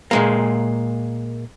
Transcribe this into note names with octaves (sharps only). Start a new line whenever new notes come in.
A#2 G#3 A#3